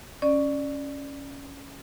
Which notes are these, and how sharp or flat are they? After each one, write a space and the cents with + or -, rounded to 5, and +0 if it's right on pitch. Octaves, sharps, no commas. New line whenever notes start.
C#4 +0 D5 +15